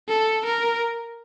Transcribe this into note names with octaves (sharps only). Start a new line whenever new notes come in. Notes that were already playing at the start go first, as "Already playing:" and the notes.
A4
A#4